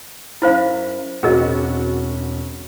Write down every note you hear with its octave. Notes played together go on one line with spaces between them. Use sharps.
F#2 E4 C5 F5 B5
E1 C4 C#4 F#4 G#4 A#4 D#5